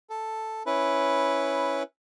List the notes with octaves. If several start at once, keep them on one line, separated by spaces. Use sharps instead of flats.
A4
C#4 E4 B4